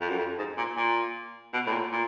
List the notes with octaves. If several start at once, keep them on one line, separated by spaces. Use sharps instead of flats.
F2
F#2
F2
G#2
A#2
A#2
B2
A2
A#2
A#2